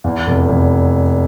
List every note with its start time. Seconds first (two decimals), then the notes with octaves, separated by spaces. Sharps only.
0.04 E2
0.27 F1
0.49 F1